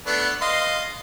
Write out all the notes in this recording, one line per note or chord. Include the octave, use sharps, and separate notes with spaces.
A3 B3 D4
D#5 F5 C6